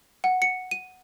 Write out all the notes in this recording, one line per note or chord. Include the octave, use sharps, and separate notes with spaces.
F#5
C#7
D#7